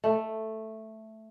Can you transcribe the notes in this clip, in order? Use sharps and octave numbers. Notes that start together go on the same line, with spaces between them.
A3